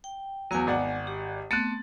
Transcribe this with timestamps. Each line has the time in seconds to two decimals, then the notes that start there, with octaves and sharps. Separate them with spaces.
0.04 G5
0.51 E2 F#3 B3 F5 G#5
0.67 G#1 D5 F#5
1.07 G4
1.51 A3 B3 C4 F#6 A6